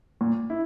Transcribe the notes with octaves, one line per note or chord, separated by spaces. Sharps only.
A#2
E4